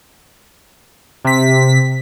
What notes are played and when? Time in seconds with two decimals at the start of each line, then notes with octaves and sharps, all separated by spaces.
1.25 C3 B6